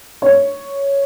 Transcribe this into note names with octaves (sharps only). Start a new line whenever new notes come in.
C#5